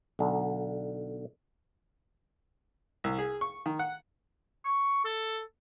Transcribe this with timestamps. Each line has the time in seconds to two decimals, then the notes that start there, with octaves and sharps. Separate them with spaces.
0.19 B1 D3
3.04 C2
3.18 G#4
3.41 C#6
3.66 D#3
3.79 F#5
4.65 C#6
5.05 A4